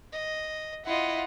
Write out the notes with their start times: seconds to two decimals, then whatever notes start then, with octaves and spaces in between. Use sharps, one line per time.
0.13 D#5
0.86 E4 F4 D#5 F#5